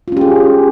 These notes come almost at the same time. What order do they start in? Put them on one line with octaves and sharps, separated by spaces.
F4 C#4 G4 G#4